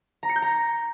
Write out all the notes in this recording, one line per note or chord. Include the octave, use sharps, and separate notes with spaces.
A#5
C#7
G6
A#5